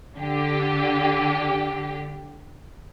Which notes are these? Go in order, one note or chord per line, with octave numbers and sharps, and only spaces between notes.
D3 G4